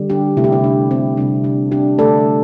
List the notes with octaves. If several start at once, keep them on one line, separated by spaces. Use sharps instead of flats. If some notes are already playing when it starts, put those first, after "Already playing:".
Already playing: D3 G3
D4 G4
C3 A3 E4
G4
C4 E4
D4
C4
C3 G3 D4
D4
D4 G4
D3 A3 A4 D5